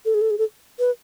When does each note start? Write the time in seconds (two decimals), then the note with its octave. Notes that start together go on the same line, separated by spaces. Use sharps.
0.05 A4
0.14 G#4
0.21 A4
0.30 G#4
0.38 A4
0.79 B4